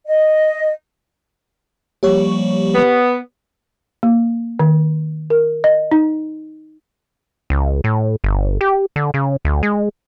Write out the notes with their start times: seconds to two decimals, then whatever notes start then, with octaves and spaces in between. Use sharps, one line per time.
0.06 D#5
2.03 F3 G3 A#3 G4 C#5 C#6
2.75 B3
4.03 A#3
4.59 D#3
5.30 A#4
5.64 D#5
5.92 D#4
7.50 C#2
7.84 A2
8.24 G1
8.61 G4
8.96 D3
9.14 C#3
9.45 D2
9.63 G#3